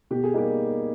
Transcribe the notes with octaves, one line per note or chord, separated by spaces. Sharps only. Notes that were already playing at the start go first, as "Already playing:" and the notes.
B2 G4
G#4
G3 A#3 D#4 G4